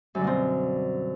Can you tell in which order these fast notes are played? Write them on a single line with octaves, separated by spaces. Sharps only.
F#2 D3 G3 B2 C4